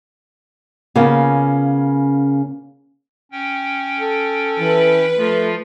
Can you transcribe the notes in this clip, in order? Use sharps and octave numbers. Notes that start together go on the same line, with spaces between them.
C#3 A#3 B3 C#4 F4
C#4 G5
A4
E3 B4
F3 A3 F4